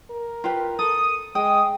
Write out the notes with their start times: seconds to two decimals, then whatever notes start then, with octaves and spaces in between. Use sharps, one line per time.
0.11 A#4
0.44 F4 G4 B4
0.79 A4 D#6
1.35 G#3 G5 D#6